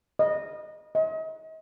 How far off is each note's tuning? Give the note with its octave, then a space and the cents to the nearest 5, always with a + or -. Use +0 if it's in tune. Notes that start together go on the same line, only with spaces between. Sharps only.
D#5 -15
D#5 +35